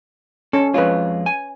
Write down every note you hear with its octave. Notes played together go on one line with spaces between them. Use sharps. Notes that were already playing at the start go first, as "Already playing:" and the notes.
C#4 A4
F2 G#3 F4 B4 C#5
G#5